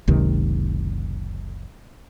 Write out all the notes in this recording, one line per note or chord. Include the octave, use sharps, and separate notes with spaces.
F#1 C#2 C3 D#3